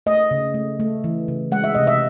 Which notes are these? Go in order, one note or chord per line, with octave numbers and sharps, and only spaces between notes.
A3 D#5
C#3
A3
A3
E3
C#3
G#3 F#5
E5
C3 D#5
E5